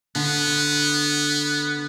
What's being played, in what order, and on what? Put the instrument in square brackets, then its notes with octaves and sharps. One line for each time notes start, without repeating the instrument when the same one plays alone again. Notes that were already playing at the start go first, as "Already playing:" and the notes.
[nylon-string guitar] D3 [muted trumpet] B3